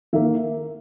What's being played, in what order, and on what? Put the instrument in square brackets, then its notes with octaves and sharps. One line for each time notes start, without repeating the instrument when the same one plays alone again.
[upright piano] D#3 A#3 E5